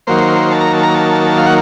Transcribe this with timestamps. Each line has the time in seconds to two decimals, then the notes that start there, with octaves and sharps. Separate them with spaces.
0.07 D#3 F#3 A#3 C5
0.51 A5
0.61 A#5
0.73 A5
0.83 A#5
0.94 A5
1.38 F5
1.46 F#5